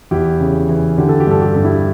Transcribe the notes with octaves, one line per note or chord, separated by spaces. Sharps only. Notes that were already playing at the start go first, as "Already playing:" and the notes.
E2 E4 G4
C#3
E3
D3 G4
A4
G4
G2 A4
G4
G2 A4
E4 G4